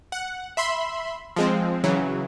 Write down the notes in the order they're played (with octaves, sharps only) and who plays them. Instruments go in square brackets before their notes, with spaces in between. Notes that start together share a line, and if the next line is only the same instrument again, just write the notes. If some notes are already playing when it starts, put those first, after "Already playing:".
[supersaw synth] F#5
E5 B5 C6
F3 G#3 C4
C#3 E3 F#3